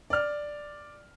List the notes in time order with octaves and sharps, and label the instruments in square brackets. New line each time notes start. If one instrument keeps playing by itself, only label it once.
[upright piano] D5 F6